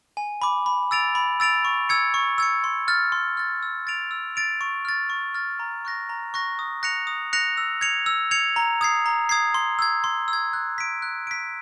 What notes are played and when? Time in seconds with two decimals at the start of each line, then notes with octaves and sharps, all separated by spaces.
0.17 G#5
0.42 B5 D6
0.66 B5
0.91 E6 A6 D7 F7
1.15 B5
1.40 E6 A6 D7 F7
1.65 C#6
1.89 E6 G#6 C#7
2.14 C#6
2.38 E6 G#6 C#7
2.64 C6
2.88 F6 A6
3.12 C6
3.37 F6 A6
3.63 E6
3.87 A6 D7 F7
4.11 E6
4.36 A6 D7 F7
4.61 C#6
4.85 F6 A6
5.10 C#6
5.34 F6 A6
5.59 A#5
5.85 C#6 F#6 A#6
6.09 A#5
6.34 C#6 F#6 A#6
6.59 D#6
6.83 F#6 A#6 C#7 F7
7.07 D#6
7.33 F#6 A#6 C#7 F7
7.57 E6
7.81 G#6 C#7 F7
8.06 E6
8.31 G#6 C#7 F7
8.56 A#5
8.81 D#6 G#6 C7
9.06 A#5
9.29 D#6 G#6 C7
9.54 C6
9.79 E6 G#6
10.04 C6
10.28 E6
10.33 G#6
10.53 F#6
10.78 B6 D7
11.02 F#6
11.27 B6 D7